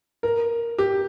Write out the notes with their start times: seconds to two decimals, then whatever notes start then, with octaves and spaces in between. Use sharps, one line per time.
0.23 A#4
0.78 G4